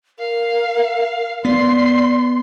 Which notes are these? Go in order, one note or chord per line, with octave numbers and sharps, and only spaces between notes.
A#4 F5
B3 D5 C6